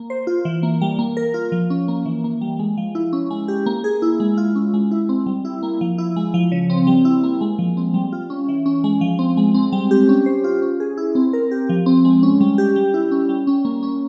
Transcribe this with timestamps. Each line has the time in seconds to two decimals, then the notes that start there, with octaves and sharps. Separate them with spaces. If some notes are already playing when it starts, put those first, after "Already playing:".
Already playing: A#3
0.10 C5
0.27 F4
0.45 E3
0.63 A#3
0.81 G3
0.99 A#3
1.17 A#4
1.34 F4
1.52 F3
1.70 C#4
1.88 A#3
2.06 E3
2.24 A#3
2.41 G3
2.59 G#3
2.77 F3
2.95 E4
3.13 C#4
3.31 G#3
3.48 G4
3.66 A#3
3.84 G#4
4.02 E4
4.20 G#3
4.37 F4
4.56 C#4
4.74 G#3
4.91 E4
5.09 C4
5.26 G3
5.45 E4
5.63 A#3
5.81 F3
5.98 E4
6.16 G#3
6.34 F3
6.52 C#3
6.70 C4
6.87 G3
7.05 E4
7.24 A#3
7.41 G#3
7.59 F3
7.77 C4
7.94 G3
8.13 F4
8.30 C#4
8.48 E3
8.66 C#4
8.84 G#3
9.01 F3
9.19 C4
9.37 G#3
9.54 C4
9.72 G3
9.91 G4
10.09 C#4
10.26 C5
10.44 F4
10.62 C#4
10.80 G#4
10.97 E4
11.15 C4
11.33 A#4
11.51 G4
11.69 F3
11.86 C4
12.05 G#3
12.23 C#4
12.41 G3
12.58 G4
12.76 G3
12.94 E4
13.11 C#4
13.29 G3
13.47 C#4
13.65 A#3
13.83 C#4